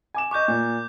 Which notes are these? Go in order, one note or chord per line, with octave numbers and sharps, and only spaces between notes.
G#5 D6 E7
D#5 C#6 D6 F#6 G6
A#2